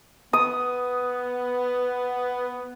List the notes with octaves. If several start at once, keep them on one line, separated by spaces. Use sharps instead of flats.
B3 D#6